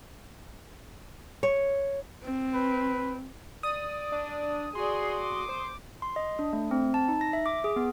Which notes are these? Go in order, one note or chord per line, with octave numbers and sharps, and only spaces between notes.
C#5
C4
B4
D5 D#6
D4
F#4 G#4 D5 C6
D6
C5
C6
D#5
D4
A3
C4
A5
D#4
A#6
E5
D6
G#4
B3